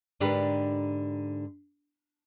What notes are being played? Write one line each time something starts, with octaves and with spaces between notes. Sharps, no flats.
G#2 D3 D4 G4 A#4 B4